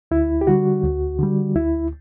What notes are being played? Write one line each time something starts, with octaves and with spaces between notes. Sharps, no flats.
D2 E4
G4
D3 G3 F#4
D2
D3 G3
D2 E4